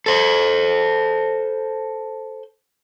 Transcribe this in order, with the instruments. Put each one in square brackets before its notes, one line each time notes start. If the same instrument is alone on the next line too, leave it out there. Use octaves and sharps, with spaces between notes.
[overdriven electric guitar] A4 C5